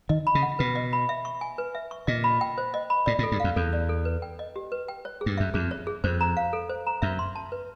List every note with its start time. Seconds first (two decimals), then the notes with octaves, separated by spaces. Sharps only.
0.09 D#3 D#5
0.27 B5
0.35 C#3
0.42 F#5
0.59 B2 B4
0.75 D#5
0.93 B5
1.09 E5
1.25 C#6
1.41 G#5
1.58 B4
1.75 E5
1.91 C#6
2.07 A#2 D#5
2.24 B5
2.41 G5
2.58 C5
2.74 D#5
2.90 B5
3.06 A2 D5
3.19 A2
3.23 A4
3.32 G2
3.40 F2 F5
3.56 E2 A4
3.73 D5
3.89 A4
4.05 B4
4.22 G5
4.39 D#5
4.56 G4
4.72 B4
4.88 G5
5.05 C#5
5.21 G#4
5.26 G2
5.38 F#2 E5
5.54 F2 G#4
5.71 C#5
5.87 G#4
6.04 F2 C5
6.21 A#5
6.37 F5
6.53 A4
6.69 C5
6.87 A#5
7.02 F#2 E5
7.19 C6
7.35 A5
7.52 B4